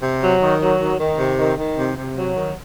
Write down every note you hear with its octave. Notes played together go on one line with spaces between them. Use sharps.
C3
F#3
D#3
F#3
D#3
D#3
C3
D#3
D#3
C3
C3
F#3
D#3